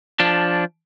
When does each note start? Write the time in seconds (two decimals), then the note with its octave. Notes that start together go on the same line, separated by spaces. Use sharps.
0.20 F3 D4